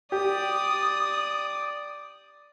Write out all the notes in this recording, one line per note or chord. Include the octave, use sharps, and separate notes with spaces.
G4 D5 D#6